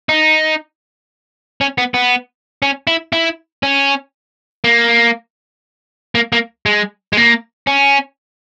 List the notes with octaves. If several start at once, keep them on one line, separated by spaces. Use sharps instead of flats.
D#4
C#4
B3
B3
C#4
E4
E4
C#4
A#3
A#3
A#3
G#3
G#3
A#3
C#4